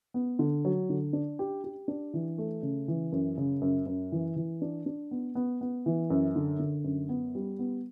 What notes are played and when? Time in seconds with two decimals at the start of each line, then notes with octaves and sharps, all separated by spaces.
0.14 B3
0.39 D3
0.65 F#3
0.89 D3
1.13 D4
1.39 G4
1.64 G4
1.88 D4
2.14 E3
2.38 A3
2.63 C#3
2.88 E3
3.12 F#2
3.37 C#3
3.61 F#2
3.86 F#2
4.12 E3
4.36 E3
4.62 D4
4.86 D4
5.11 B3
5.35 B3
5.61 B3
5.86 E3
6.10 F#2
6.36 D3
6.59 D3
6.84 F#2
7.09 B3
7.35 G3
7.59 B3